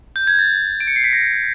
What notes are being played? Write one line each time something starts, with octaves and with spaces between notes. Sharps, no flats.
G6
G#6
A6
D7
C#7
C7
B6
A#6